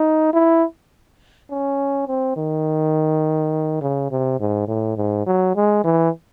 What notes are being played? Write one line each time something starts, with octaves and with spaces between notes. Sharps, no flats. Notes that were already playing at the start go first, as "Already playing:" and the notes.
Already playing: D#4
E4
C#4
C4
D#3
C#3
C3
G#2
A2
G#2
F#3
G#3
E3